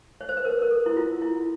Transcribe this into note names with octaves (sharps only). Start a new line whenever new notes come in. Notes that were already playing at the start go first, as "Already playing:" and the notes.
C#5
C5
B4
A#4
A#4
A4
E4
F4
E4